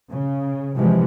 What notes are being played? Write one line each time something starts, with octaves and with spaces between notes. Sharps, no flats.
C#3
C3 E3 F3 G#3